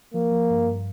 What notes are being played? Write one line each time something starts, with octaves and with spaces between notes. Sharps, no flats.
F3 A#3
F3
G2
G2